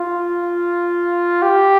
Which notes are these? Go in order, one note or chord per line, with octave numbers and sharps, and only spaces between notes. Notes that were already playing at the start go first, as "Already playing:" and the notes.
Already playing: F4
G4